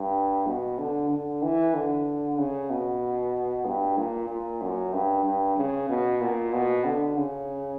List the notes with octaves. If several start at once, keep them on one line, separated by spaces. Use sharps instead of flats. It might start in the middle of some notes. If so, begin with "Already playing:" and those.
Already playing: G2
B2
D3
D3
E3
D3
C#3
B2
G2
A#2
A#2
F#2
G2
G2
C#3
B2
A#2
B2
D3
C#3